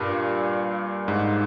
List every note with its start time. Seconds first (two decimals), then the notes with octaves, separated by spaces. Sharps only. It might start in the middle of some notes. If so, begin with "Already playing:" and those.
Already playing: G2 A#2
1.08 G#2